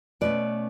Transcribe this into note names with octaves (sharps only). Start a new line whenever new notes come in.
B2 A3 C#4 B4 D5